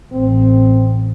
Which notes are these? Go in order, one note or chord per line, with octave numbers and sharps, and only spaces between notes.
A1 C4